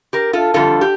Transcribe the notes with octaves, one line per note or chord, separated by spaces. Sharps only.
G4 A#4
F4 A4
F2 D3 G3 F4 A4
G4